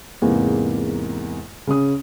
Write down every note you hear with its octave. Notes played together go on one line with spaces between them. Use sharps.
E2 G#2 C3 A#3
C#3 C#4 D#6